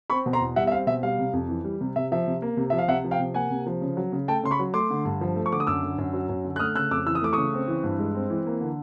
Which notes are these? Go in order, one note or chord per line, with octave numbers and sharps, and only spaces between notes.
C4 B5 C#6
B2
A#5 C6
E2
G3 E5 F#5
E5
C4 F5
B2 E5
G3 F5
C3
F2
E3
G3
C3
C3 E5
F3 E5
C3
A#3
C3
F3 E5
F5
C3 E5 F#5
F3
F5 G5
C3
A#3 F#5 G#5
C3
F3
C#3
F#3
C#3
A3 G5 A5
C#3 C6
B5 C#6
F#3
A3 C6 D6
D3
G2
F3
A3
C#6
D3 D6
D#6
F#2 D6 E6
D3
F#2
F#3
F#2
D3
F#6
A3 D#6 F6
C#3 E6 F#6
F2 D6 E6
E3 E6
D#6
A3 D6
C#3 C#6 D#6
C4
E3
G2
G#3
C4
E3
A#3
D3